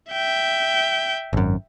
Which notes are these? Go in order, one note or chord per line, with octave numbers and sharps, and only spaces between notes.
E5 G5
G#1 F#2